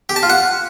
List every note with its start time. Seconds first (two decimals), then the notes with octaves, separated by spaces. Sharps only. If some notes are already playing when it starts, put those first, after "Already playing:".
0.09 G4
0.16 A5
0.23 F4
0.30 F#5